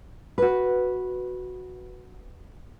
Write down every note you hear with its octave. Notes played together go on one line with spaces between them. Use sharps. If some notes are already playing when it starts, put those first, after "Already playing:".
F#4 B4